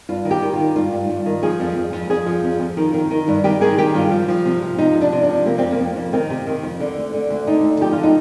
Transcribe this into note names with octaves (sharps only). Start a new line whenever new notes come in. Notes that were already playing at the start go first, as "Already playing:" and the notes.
G2 F4
D#3
G4
D#3
F4
D#3
G2 F4
G2
G2
D#3
F3 G#4
F2
F2
F2
F2 G#4
F3
F2
F2
D#3
D#3
D#3
G2
D#3 G4
D#3 G#4
D#3 G4
G2 F4
F3
F3
C3
F3
C3 D#4
F2
D4
C3
D4
F3
C3 A#3
F2 C4
A#3
F2
F2
D#3 C4
C3
D#3
F2
D3
D2
D3
D2
D3 D#4
D2
F3 G4
F4
D3
D#4